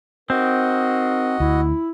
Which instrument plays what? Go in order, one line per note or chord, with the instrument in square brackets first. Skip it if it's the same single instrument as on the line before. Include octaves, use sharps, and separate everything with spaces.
[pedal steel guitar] C4 [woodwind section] D#4 A#4 [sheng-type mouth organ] F#4 D#5
[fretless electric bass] D2 [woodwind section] E4